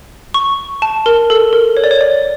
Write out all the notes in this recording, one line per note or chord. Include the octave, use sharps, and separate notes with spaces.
C#6
A5
A#4
A4
A#4
C#5
D5
C#5
D5